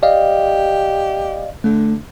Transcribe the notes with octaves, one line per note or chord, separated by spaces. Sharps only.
G4 D5 D#5 F5
D3 A3